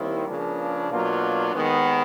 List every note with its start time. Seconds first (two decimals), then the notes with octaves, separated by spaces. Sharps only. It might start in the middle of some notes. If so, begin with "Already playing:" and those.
Already playing: D#2 D#3 G3 C4 E4
0.26 C#2 C#3 F3 A#3 D4
0.90 B2 F#3 A#3 D4 F4
1.54 D#2 D#3 G#3 B3